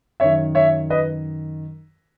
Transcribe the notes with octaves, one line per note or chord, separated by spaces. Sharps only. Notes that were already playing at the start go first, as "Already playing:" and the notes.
F#2 D#3 C#5 E5
C#5 E5
B4 D#5